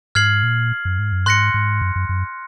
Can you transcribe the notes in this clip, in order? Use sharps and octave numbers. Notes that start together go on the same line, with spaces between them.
G#2 F6 G#6 C7 F#7
A#2
F#2
G#2
F#2
G#2 C6 F#6 A#6 C#7
G#2
F#2
F#2
F#2